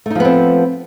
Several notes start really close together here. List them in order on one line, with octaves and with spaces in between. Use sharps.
A3 D#4 F3 B3 C4